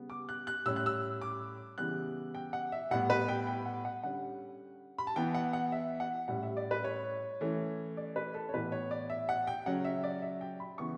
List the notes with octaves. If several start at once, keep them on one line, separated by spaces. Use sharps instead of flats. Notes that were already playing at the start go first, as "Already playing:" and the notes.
Already playing: C#3 G3 B3
D6
F#6
F#6
A2 G3 C#4 E6
F#6
E6
D6
C#3 E3 G3 B3 F#6
G5
F#5
E5
A2 G3 B3 F#5
B4
G5
G5
F#5
F#5
D3 G3 C#4 F#5
B5
A5
E3 B3 G5
F#5
F#5
E5
F#5
A2 G3 C#4 F#5
E5
D5
B4
C#5
E3 A3 C#4
D5
B4
A4
C#5
A2 E3 B3 B4
C#5
D5
E5
F#5
G5
C#3 F#3 C#4 F#5
E5
D5
E5
G5
B5
C#3 E3 B3 C#6